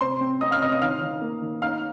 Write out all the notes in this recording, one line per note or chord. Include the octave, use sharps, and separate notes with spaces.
C3 C5 C6
C4
C4 D#5 D#6
F5 F6
C3 D#5 D#6
D#5 D#6
D#3 F5 F6
D#3
A#3
D#3
D#4 F5 F6